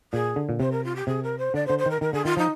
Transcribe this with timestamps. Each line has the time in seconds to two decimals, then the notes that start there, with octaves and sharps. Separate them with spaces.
0.12 A#2 G#4
0.36 D3
0.49 A#2
0.60 C3 C5
0.71 A#4
0.84 F4
0.95 G4
1.07 C3 G#4
1.23 A#4
1.38 C5
1.54 D3 D5
1.66 C5
1.70 D3
1.78 C5
1.86 D#3 A#4
2.01 D#3 A#4
2.12 D3 G#4
2.24 D#3 F4
2.37 F3 D#4